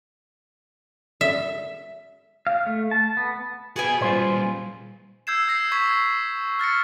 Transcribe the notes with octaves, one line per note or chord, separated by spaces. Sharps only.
E5
F5
A3
A5
B3
F#4 G#4 B4 G#5 B5
A#2 G3 F4 C5
E6 G6 G#6 C7 E7
D#6 A#6 C7
C#6 G#6 B6
F6 A6 A#6 C#7